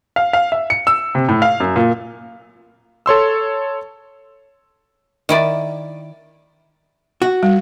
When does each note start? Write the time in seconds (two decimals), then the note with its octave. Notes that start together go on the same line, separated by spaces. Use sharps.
0.16 F5
0.33 F5
0.52 E5
0.70 C#7
0.87 E6
1.15 C3
1.29 A2
1.42 F5
1.60 F#2
1.76 A#2
3.06 A4 C#5 C6 E6
5.29 D#3 E4 D5
7.22 F#4
7.43 G3